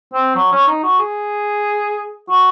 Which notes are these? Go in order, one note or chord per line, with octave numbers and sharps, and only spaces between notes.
C4
F#3
C#4
D#4
F#4
G#4
F#4